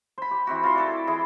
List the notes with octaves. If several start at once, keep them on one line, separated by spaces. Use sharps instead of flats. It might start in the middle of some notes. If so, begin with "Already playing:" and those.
C5 B5
G4
E3 C4 F#4
F4 F#4 C6
E4 A4 D5
E3 E4 G#4 C6